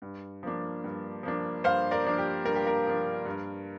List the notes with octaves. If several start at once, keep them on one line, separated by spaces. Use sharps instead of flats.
G2
F3 A#3 D4
G2
F3 A#3 D4
G2 C5 F5
A#4 D5
F3 A#3 D4
G4
G2 A#4
G4
A#4
F3 A#3 D4
G2